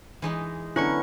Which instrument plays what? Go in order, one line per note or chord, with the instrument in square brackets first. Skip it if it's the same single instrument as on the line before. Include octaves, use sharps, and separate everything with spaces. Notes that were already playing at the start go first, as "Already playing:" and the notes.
[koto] E3 G#3 D#4
[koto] D3 [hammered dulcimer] F#3 B3 C#4 [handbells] E4 C#6 C#7